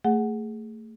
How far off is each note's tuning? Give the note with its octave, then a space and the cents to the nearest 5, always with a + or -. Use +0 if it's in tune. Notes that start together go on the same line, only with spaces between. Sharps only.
A3 +20 G#4 +0 F#5 +0